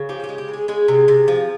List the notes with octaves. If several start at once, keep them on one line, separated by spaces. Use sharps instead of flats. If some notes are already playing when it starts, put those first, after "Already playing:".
Already playing: C#3
F3 G4
G4
G#3
G4
C#3 G#4
G#3 G#4
C3
C3
F3